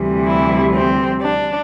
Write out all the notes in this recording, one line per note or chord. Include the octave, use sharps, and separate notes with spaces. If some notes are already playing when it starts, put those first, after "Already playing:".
Already playing: D2 C3 E3 G3
E4
C4
D4